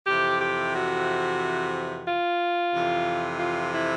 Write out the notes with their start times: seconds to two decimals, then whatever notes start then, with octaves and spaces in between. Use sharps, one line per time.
0.07 F2 C3 E3 G4
0.41 G4
0.74 F#4
2.07 F4
2.74 F2 C3 E3
3.40 F4
3.74 E4